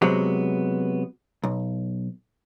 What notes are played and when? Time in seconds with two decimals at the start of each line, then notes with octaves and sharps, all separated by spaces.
0.02 C3 F#3 G#3 B3
1.44 B1